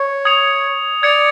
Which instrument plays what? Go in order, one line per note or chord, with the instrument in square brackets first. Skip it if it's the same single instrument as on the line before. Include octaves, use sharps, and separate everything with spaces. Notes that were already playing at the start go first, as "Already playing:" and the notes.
Already playing: [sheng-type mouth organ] C#5
[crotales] D#6 G#6 C#7 F7
[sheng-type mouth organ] D5 [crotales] G#6 C#7 F7